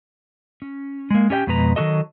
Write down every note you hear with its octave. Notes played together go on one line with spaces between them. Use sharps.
C#4
G#3 A#3
C#4 G4 D5 G5
F2 B2 G#3 B4 A#5
D#3 F#3 G#3 F#4 A4 D#5